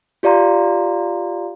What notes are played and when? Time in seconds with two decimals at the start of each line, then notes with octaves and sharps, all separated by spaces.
0.23 F4 G4 D5 F5 A#5 C6